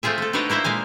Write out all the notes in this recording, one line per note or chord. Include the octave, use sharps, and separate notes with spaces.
A3 C4 F4 G#4 E5
A3 A4
D4 D#4 F#4 B4 C#5 D#5
A#3 E4 C5 E5
A#2 G#3 F5 G#5